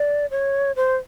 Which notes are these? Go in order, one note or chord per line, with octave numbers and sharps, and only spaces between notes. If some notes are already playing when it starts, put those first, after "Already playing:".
Already playing: D5
C#5
C5